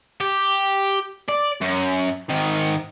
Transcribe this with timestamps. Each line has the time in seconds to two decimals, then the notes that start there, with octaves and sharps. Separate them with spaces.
0.21 G4
1.29 D5
1.61 F#2
2.30 G#2 D#3